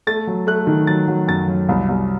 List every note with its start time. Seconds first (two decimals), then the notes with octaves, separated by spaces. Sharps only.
0.07 A3 A6
0.27 F#3
0.47 A3 F#6
0.67 D#3
0.87 F#3 A6
1.08 F#3
1.28 F#2 A6
1.48 F#3
1.69 C2
1.89 C2